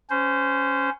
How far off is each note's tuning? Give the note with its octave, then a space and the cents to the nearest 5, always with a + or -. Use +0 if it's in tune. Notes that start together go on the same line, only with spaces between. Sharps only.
C#4 +0 C5 -25